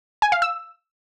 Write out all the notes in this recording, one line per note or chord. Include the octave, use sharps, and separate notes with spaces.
G#5
F5
E6